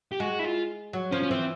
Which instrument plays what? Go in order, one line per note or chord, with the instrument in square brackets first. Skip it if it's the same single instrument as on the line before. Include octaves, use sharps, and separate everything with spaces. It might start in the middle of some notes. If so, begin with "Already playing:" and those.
[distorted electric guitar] G4
[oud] G#3 [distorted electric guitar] F#4
[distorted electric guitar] E4
F4
[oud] F#3
[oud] F3 [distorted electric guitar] C#4
[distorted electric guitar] C#4
[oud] E3 [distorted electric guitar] C4